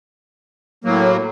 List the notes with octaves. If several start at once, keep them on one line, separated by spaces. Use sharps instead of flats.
A2 F#3 A#3